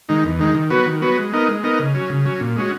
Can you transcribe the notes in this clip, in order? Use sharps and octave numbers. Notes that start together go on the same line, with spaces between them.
D#3 G#3 D#4
E2
D#3 G#3 D#4
D#3
F#3 B3 F#4 B4
D#3
F#3 B3 F#4 B4
G#3
B3 D#4 A#4 D#5
G#3
B3 D#4 A#4 D#5
C#3
F#3 C#4
C#3
F#3 C#4
A#2
G#3 C#4 F#4